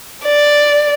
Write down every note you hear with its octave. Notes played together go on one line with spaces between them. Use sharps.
D5